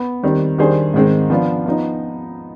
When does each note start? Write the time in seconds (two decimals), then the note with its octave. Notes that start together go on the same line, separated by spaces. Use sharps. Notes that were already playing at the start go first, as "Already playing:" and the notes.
Already playing: B3
0.23 D#3 G3 C4
0.58 D#3 G3 D4 G#4 C5
0.94 G#2 D#3 G#3 C4
1.30 F3 B3 D4 F4
1.66 F3 B3 D#4